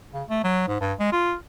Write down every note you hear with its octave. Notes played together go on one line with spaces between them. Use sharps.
C#3
A3
F#3
G#2
G2
G#3
F4